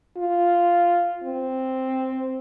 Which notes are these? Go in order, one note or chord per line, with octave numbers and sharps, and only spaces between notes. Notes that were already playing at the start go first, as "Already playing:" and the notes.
F4
C4